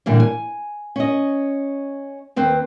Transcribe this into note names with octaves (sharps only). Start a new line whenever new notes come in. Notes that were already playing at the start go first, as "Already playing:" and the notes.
A#2 D3 E3 G3
G#5
C#4 D#5
D#2 C4 B4